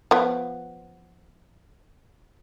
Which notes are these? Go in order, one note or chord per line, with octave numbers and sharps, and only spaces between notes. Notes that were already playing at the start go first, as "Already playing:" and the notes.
F3 B3